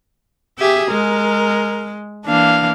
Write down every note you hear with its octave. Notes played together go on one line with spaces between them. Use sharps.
G4 G#4 E5
G#3 A#4
E3 A#3 D4 F5